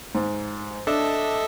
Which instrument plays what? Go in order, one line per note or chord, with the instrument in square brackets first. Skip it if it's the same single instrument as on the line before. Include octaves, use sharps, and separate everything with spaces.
[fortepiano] G#2
[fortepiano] D4 [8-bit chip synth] A4 D#5 E5